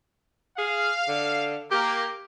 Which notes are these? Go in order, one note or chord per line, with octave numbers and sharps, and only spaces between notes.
G#4 F5
D3
A#3 G4